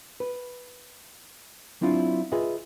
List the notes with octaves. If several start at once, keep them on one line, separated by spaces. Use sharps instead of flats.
B4
F#3 C4 D4 E4 F4
F4 G#4 B4 D#5 E5